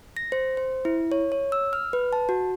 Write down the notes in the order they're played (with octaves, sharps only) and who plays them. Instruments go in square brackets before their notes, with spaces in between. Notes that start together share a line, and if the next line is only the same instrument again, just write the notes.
[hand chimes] A#6
C5
C5
E4
C#5
C#5
E6
F6
B4
A5
F#4